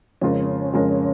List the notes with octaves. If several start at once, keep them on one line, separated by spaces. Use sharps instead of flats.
F2 C#3 G#3 C#4 F4 A#4
F2 C#3 G#3 F4 A#4